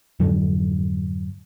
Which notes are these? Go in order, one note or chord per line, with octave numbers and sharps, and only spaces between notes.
F2 G#2 D3 F#3